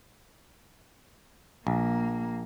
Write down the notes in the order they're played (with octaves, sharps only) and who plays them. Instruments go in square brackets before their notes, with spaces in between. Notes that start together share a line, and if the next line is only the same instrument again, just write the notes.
[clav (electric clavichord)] A#1 [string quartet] A#3